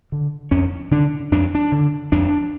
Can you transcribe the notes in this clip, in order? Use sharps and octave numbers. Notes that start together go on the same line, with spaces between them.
D3
F2 C#4
D3 D4
F2 D4
D4
D3
F2 D4